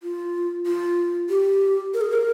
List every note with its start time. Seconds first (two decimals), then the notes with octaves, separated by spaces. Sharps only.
0.03 F4
0.66 F4
1.30 G4
1.94 A#4
2.01 G#4
2.10 A#4